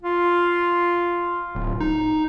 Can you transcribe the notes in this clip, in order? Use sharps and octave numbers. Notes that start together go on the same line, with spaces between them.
F4
D1
D#4